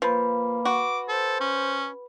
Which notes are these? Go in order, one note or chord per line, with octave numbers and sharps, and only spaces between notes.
F3 A#3 B4 B5
F#4 D6
A4 C5
C#4